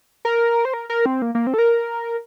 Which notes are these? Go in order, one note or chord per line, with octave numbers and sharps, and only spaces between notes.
A#4
C5
A#4
A#4
C4
A#3
A#3
C4
A4
A#4